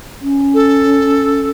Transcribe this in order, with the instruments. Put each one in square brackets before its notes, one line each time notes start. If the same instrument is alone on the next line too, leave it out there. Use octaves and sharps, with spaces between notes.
[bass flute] C#4
[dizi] A4